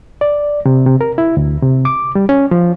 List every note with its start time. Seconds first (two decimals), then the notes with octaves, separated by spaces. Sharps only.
0.21 D5
0.66 C3
0.86 C3
1.01 A#4
1.18 E4
1.37 D2
1.62 C3
1.85 D6
2.15 G3
2.29 C#4
2.51 F3